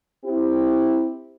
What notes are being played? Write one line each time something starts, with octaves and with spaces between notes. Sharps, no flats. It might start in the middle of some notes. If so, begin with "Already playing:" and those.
C4 E4 G4